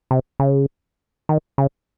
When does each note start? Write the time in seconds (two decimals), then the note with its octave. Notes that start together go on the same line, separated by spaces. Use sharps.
0.11 C3
0.39 C#3
1.29 D#3
1.58 C#3